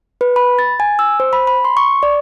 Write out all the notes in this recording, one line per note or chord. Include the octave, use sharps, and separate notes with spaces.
B4
B5
A6
G#5
E6
C5
B5
B5
C6
C#6
D5